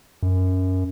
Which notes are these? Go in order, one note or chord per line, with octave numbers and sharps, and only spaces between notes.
F#2